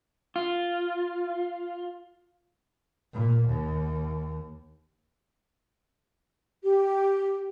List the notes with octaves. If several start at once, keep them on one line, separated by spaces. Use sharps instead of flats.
F4
A#2
D#2
G4